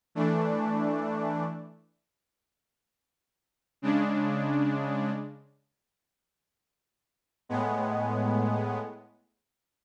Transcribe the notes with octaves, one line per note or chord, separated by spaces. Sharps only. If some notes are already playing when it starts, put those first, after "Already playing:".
E3 A3 D4
C#3 G#3 D4
A2 G#3 B3